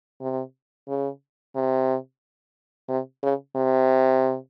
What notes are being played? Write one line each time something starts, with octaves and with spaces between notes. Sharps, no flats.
C3
C#3
C3
C3
C#3
C3